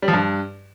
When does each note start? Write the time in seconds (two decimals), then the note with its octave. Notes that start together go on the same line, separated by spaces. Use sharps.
0.02 G3
0.08 F3
0.13 G2